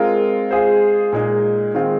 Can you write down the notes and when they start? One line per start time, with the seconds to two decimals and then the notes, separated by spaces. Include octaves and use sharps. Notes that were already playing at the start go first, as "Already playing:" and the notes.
Already playing: G#3 C4 F4 A#4
0.51 G#3 F4 G#4 C5
1.13 A#2 G#3 D#4
1.74 D#3 G#3 C4 F4